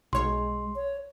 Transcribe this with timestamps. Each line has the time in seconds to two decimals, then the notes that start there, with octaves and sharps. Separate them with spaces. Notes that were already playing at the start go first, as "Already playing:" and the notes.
0.13 B1 G#3 C#5 C6
0.76 C#5